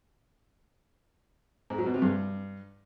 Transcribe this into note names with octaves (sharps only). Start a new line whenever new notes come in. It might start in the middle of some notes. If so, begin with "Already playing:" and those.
G#2
F#3
B2
C3
G2